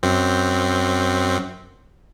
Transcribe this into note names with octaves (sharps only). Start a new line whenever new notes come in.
F#2 C4